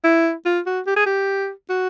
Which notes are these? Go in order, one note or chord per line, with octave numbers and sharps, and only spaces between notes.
E4
F4
F#4
G4
G#4
G4
F#4